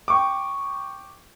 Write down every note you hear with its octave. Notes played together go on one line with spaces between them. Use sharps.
G5 C#6 D6